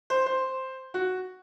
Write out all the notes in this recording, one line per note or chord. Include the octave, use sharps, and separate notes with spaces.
C5
C5
F#4